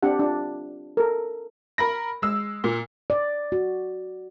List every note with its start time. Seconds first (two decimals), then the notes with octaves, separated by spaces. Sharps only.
0.03 C4 D4 G4 F#5
0.19 D4 F4
0.97 A4 A#4
1.78 A#4 B5 A#6
2.22 G#3 E6
2.64 A#2
3.10 D5
3.52 F#4